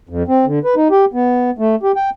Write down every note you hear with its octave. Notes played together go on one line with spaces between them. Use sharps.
F2
C4
D3
B4
D#4
G4
B3
A3
G4
G5